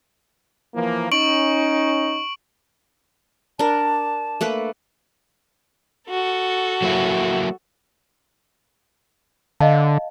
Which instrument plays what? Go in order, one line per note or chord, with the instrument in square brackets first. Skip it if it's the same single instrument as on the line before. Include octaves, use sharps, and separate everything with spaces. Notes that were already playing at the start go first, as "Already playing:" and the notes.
[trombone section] E3 F3 A#3
[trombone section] C#4 D#4 [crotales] C#6 D7 F#7
[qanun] D4 A#4 [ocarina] A5
[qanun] A3 A#3 B4
[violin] F#4 A4
[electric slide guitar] F#3 A#3 E4
[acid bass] D3 [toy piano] D#5 F5 A5